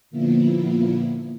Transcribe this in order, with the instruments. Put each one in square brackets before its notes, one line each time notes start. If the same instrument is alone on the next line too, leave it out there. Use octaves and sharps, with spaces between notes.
[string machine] A#2 D3 F3 A#3 B3 E4